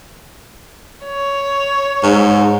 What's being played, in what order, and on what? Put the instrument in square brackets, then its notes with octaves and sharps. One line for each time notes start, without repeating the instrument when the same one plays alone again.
[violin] C#5
[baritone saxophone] G#2